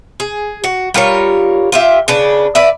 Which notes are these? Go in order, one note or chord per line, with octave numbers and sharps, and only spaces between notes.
G#4
F#4
G3 F4 A#4 C#5
F4 G4 E5
C#3 D4 B4
B4 D5 E5